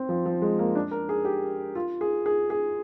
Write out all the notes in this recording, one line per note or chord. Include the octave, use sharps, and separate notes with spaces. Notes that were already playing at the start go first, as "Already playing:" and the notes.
Already playing: C4
F3
F3
G#3
A#3
D4
A#4
G#4
G4
F4
G#4
G#4
G#4